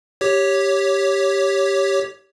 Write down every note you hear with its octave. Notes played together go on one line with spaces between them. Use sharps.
G4 C#5